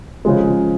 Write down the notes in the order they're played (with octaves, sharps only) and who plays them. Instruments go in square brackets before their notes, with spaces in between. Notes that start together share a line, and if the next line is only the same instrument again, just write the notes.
[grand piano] C#3 F3 G#3